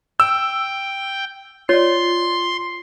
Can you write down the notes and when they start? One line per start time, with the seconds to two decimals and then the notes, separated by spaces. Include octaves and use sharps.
0.20 G5 E6
1.69 F4 C#5 D5 C6